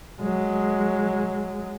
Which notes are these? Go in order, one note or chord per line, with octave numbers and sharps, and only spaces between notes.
F#3 G#3